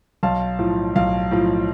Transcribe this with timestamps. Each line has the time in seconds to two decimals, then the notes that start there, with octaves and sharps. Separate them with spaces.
0.23 B1 F5 A5
0.59 A2 F3
0.96 B1 F5
1.31 A2 F3